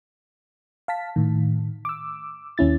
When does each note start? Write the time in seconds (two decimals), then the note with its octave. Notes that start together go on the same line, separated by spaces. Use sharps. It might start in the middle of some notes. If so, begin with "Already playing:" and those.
0.88 F5 A5 B6
1.16 A2 D#3
1.85 D6 E6
2.58 D#2 C#4 E4 A6